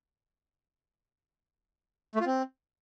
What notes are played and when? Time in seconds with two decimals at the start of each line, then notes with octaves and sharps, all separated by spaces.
2.15 A3
2.21 F4
2.26 C4